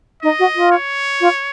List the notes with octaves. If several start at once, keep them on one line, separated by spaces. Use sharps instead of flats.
D#4 D#5
F#4
F4
C#5
F4